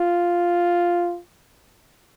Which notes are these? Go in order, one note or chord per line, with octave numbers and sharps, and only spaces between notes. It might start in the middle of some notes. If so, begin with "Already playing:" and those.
Already playing: F4